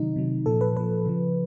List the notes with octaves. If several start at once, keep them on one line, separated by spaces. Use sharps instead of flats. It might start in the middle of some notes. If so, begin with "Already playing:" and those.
Already playing: C3 D#3 F#3 D#4
C3 D#3 F#3
A#2 F3 A4
B4
A#2 F3 B4
C#3 F3